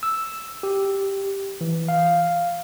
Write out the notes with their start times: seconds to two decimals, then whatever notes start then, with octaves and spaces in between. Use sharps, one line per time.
0.03 E6
0.63 G4
1.61 E3
1.89 F5